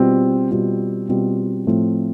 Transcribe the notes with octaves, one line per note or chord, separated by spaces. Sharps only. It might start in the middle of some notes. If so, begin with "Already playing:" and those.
Already playing: B2 G3 C4 F4
B2 G3 C4 F4
B2 G3 C4 F4
A2 F3 A3 C4 F4